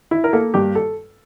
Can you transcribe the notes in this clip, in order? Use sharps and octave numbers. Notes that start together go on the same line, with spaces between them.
E4
A#4
A#3 A4
G2 G4
A4